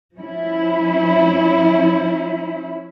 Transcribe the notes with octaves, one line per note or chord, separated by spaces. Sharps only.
F3 C#4 E4